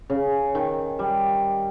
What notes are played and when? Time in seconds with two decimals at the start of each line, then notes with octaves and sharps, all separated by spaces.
0.10 C#3
0.55 D#3
0.99 G3